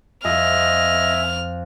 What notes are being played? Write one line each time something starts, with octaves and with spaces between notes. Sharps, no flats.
F2 D#5 E5 G#5 F6